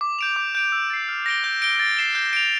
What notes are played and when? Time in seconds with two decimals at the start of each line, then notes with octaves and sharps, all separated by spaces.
0.01 D6
0.19 G6 D7 F7
0.36 D6
0.55 G6 D7 F7
0.72 E6
0.90 A6 C7
1.08 F6
1.26 A#6 D7 G7
1.44 G6
1.62 D7 G7
1.79 A6
1.97 C7 E7 G7
2.15 G6
2.33 D7 F7